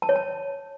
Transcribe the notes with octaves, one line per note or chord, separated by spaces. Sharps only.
A5
C#5
A5